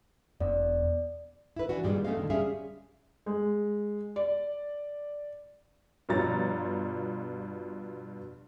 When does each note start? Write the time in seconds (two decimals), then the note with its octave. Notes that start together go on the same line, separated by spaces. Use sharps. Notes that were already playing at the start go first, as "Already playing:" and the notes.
0.40 E1 B3 D5
1.56 E4 B4
1.69 E3 D4 F#4
1.83 G2 A#2 D#3 G3 G#3 B3
2.05 A3 B3 C#4 F4 D#5 F5
2.17 A#2 D3 D#3
2.30 G3 G#3 C#4 G#4 E5 F5
3.26 G#3
4.16 D5
6.09 G2 B2 F3 C#5 A#5 A6